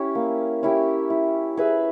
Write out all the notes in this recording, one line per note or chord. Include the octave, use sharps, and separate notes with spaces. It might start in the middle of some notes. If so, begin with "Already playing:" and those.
Already playing: C#4 E4 G4
A#3
C#4 E4 G4
E4
G#4 B4 E5